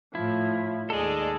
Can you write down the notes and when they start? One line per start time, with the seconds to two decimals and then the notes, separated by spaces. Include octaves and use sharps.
0.15 A2 F3 E4
0.90 D#2 G#3 G#4 A4 D5